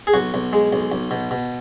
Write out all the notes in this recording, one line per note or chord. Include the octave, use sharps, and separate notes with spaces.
G#4
B1 F#4
B1
G#3
B1
B1
B2
B2